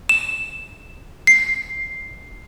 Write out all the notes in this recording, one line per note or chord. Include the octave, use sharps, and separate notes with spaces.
E7
C7